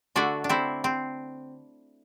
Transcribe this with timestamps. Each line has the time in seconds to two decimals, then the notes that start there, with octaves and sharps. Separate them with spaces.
0.16 D3 A3 D4 F#4
0.44 D4
0.49 C4 E4
0.84 C4